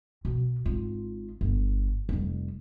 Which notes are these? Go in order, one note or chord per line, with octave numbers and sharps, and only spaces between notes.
B2
G#1 F4
G1
F1 G3